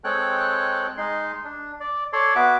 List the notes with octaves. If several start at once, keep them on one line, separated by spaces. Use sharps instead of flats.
G#3 C4 A4 C#5 G5 F#6
G#3 D#4 C6
D4
D5
A4 C#5 D5 C6
B3 F#4 E5 D6